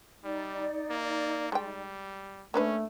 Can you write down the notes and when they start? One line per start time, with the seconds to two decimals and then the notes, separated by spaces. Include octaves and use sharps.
0.24 G3 D#4 D5
0.90 A#3
1.52 G3 G#3 G5
2.54 A3 A#3 C#4 D4 B4